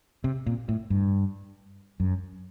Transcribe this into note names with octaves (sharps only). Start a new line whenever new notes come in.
C3
A#2
A2
G2
F#2